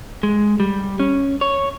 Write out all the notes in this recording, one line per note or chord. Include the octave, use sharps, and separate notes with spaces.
G#3
G3
C#4
C#5